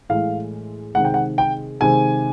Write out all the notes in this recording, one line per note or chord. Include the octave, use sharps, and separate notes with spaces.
A2 E3 G#3 F5
C3 D#3 G#3 F#5
G5
F#5
G5
C3 D#3 G#3 G#5